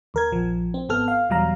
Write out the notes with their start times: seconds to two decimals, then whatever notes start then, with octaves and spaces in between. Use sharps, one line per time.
0.14 D#2 A#4 G#6
0.32 A#1 F3
0.74 C4
0.89 G#1 B3 A4 F6
1.08 F5
1.30 E2 B2 F#3 G3 F5 A#5